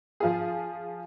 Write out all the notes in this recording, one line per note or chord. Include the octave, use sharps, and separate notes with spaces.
F3 F4 G#4